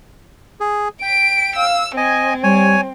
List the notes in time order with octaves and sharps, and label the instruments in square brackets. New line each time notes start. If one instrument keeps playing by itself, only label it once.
[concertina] G#4
[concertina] G5 [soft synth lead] B6 [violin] D7
[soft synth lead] F5 [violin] E6
[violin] C4 [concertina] D#5 G#5 [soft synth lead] G#6
[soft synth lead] G3 [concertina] C#5 G#5